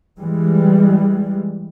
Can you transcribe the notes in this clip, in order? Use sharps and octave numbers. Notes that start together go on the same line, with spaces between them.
E3 G3 G#3